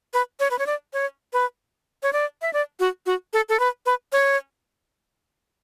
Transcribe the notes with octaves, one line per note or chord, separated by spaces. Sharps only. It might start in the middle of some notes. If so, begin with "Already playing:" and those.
B4
C#5
B4
C#5
D5
C#5
B4
C#5
D5
E5
D5
F#4
F#4
A4
A4
B4
B4
C#5